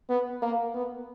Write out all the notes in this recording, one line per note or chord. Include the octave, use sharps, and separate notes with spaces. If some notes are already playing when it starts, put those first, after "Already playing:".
B3
A#3
B3